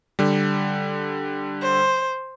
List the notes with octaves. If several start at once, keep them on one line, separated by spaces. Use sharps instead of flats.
D3 G3
C5